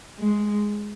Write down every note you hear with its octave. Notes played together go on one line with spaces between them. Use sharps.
G#3